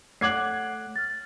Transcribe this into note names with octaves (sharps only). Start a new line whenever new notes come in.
A3 C#5 F#5 D6 F#6 G#6 C7 F#7
F6 A6